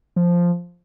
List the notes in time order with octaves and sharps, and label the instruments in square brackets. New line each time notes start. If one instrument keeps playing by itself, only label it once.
[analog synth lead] F3